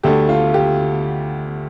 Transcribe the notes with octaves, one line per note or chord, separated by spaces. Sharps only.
D2 D3 A3 G4
F4
G4